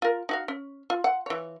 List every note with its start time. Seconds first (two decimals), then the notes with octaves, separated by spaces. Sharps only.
0.02 F4 A#4
0.29 D#4 F#4 F5
0.48 C#4
0.90 F4
1.04 F#5
1.26 E3 C#5